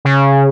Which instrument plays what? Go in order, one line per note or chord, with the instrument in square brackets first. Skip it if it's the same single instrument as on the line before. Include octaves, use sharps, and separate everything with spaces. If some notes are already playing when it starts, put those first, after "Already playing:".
[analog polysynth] C#3